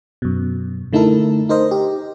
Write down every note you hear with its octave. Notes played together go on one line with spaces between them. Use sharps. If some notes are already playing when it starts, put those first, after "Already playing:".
F#2 B2
D3 A3 D#4 E4 A4 A#4
D#4 A#4 C5 D#5
G4